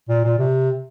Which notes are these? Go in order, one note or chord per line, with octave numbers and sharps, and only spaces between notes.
A#2
A#2
C3